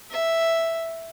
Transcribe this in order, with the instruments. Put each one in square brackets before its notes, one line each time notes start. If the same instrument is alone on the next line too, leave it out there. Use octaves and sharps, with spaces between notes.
[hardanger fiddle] E5